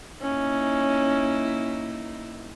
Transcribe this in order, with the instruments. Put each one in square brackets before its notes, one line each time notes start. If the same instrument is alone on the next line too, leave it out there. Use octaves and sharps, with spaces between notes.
[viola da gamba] A#3 D#4 E4 [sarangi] C#4